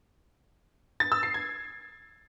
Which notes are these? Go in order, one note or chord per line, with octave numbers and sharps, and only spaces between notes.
A6
E6
C7
G#6